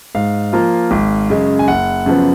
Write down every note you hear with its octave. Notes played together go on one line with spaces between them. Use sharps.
G#2 F5
F3 A#3 F4
G#1
F#2 C#3 G#3
G#5
F#1 F#5
F#2 C#3 F3 B3